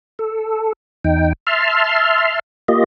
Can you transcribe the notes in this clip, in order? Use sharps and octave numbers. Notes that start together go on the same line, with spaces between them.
A4
E2 D#4 G5
E5 A5 C6 F6
A#3 F4 G4 D#5